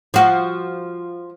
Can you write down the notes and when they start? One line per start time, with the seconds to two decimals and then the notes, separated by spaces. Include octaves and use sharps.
0.14 F3 F#4